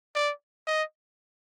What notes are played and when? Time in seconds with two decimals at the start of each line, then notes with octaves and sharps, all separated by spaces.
0.15 D5
0.67 D#5